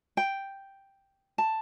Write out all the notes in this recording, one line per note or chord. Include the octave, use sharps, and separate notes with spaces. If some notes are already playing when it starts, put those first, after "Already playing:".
G5
A5